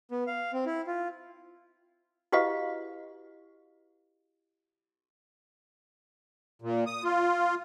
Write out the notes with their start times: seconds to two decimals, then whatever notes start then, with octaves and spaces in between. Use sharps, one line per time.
0.11 B3
0.27 F5
0.53 C4
0.66 E4
0.87 F4
2.32 E4 F#4 G4 B4 D#5 F5
6.62 A#2
6.86 D#6
7.04 F4